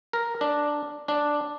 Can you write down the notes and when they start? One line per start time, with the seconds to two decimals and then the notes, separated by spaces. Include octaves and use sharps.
0.13 A#4
0.41 D4
1.08 D4